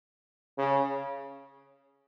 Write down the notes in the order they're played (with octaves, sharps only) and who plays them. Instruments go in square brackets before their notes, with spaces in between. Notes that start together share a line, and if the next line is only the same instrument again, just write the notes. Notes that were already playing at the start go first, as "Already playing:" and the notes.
[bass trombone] C#3